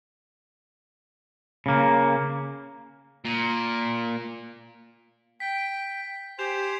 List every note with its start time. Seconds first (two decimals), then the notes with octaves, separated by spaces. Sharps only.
1.66 C#3 A#3
3.25 A#2
5.40 G5 B6
6.39 G4 C5 G#5 C6 G6 E7 F7